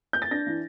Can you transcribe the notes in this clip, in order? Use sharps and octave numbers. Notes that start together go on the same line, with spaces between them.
G6
A6
D4 A#6
E3